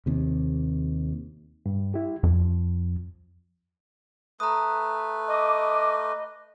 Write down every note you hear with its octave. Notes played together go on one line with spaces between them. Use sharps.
D#2 C3
G2
E4 G4
F2 F3
A3 B4 A#5 D#6
D#5 D6